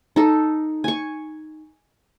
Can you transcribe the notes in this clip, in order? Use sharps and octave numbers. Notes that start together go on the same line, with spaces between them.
D#4 A4
G#5 C#6